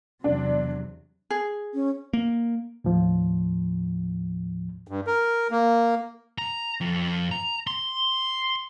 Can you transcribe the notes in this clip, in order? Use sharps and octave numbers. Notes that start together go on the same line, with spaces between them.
E2 C3 F#3 D4
G#4
C#4
A#3
D#2 A2 F3
G2
A#4
A#3
A#5
F2
A#5
C6